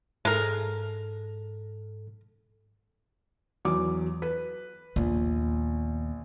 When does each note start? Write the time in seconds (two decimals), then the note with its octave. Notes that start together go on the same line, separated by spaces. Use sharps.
0.25 G#2 G#3 A4 A#4
3.65 E2 F#3 D6
4.22 B4
4.96 A#1 D#2 B3